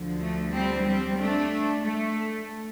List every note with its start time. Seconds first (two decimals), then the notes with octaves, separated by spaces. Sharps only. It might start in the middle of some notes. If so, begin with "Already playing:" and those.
Already playing: D2 D3 F3
0.22 A3
0.54 G3 C4
0.86 G3 C4
1.18 A3 D4
1.84 A3